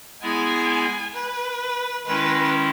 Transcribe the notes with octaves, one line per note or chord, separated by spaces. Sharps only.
G#3 B3 E4 G#4 G#5
B4
D#3 G#3 C#4 E4 B4